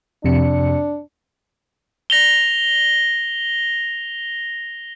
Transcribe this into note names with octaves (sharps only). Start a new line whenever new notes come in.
F2 C3 D4 C#7
A#6 F7 G7